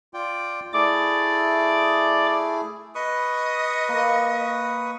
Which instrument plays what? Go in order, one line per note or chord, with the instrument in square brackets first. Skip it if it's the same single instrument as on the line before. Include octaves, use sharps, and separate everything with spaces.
[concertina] F4 D5 G5
[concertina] A3 E4 G#4 [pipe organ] D5 D6
[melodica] B4 C#6 D#6 [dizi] D#5
[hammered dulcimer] A#3